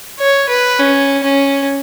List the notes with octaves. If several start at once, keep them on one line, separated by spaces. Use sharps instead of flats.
C#5
B4
C#4
C#4